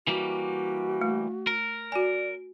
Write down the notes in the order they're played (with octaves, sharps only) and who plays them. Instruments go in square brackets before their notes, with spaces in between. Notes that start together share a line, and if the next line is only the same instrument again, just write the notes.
[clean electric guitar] E3 G3 A#3 [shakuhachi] F#4
[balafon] A3
[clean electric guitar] A#4
[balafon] F#4 G#5 [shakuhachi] D5